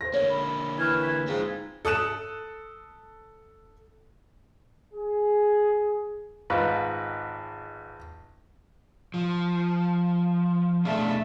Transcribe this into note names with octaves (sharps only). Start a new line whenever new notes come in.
C5 A#6
D3 A#3 C#5
B5
E3 C#6 F6 G#6
G#6 B6
G#2 C4 F4
A4 D#6 F#6 E7
G#4
G#1 G#2 F4 B4
F3
B2 A3 D4 E5 F5